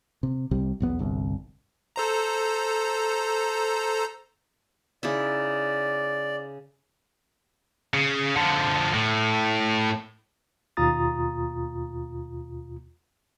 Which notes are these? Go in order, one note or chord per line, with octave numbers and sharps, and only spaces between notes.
C3
C2 C3 G3
B1 E2 B3
G1 C2
A4 C5 A#5
C#3 D#4 E4 D5
C#3
D3 F3
A2
D#2 B2 F4 A#5 D#6 A6